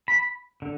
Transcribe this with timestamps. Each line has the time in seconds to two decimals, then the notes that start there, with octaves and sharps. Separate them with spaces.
0.08 B5
0.62 D3